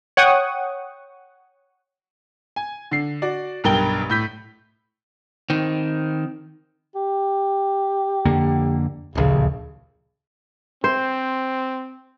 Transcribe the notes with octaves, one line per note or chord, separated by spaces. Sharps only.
C#5 F#5 G5 C#6 D#6
G#5
D3 C7
F#4 D5
B1 G2 A#4 G5 G7
A2 G6 B6
D#3 C4
G4
F2 D3 A#3
D1 A#1 D#2 C#3
C4 C5